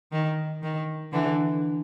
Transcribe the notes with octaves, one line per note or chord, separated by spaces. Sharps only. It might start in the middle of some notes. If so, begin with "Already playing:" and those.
D#3
D#3
D3 E3